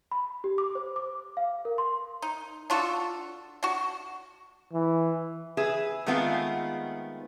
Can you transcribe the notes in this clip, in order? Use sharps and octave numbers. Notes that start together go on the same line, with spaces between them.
B5
G4
D6
C5
D6
F5
A#4
C6
D#4
D4 F4 F#4 A4
D4 F#4
E3
G#4 B4 E5
D#3 G#3 A3 B3 C4 F4